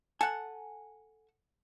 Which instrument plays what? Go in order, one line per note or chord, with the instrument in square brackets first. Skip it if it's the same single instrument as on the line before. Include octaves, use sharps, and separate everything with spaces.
[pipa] A4 F#5 [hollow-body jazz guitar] G#5